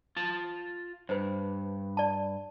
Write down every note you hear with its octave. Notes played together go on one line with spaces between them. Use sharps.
F4 A5
G2 B4 C5
D5 A5